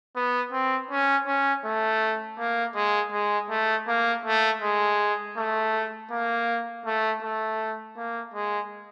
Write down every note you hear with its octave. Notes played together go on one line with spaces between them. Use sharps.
B3
C4
C#4
C#4
A3
A#3
G#3
G#3
A3
A#3
A3
G#3
A3
A#3
A3
A3
A#3
G#3